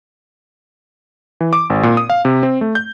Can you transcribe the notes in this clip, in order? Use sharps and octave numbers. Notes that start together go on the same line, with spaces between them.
E3
D6
G#1
A#2
D#6
F5
C3
C4
A3
G6